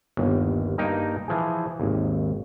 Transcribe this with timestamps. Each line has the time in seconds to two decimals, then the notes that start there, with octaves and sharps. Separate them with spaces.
0.17 G1 D#2
0.78 G2 A#3 D#4 G5 A#5
1.28 E3 F3 G#4
1.80 G#1 D#2